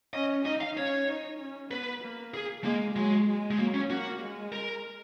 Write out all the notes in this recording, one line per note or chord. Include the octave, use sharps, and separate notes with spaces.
C#4 D#5
D#4 D#5
F5
C#4 C#5
D#4
C#4
B3 B4
A#3
G#4
G#3 A#3
F#3 G#3
G#3
G#3
F#3 A#3
C#4
A#3 F#4
G#3
A#4